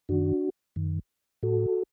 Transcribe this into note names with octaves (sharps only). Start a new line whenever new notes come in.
F#2 D#3 D4 F#4
F#2 D#3
A2 F#4 A4